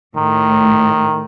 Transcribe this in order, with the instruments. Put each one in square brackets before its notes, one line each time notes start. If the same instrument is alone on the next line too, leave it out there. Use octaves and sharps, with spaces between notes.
[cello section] A2 [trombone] D#3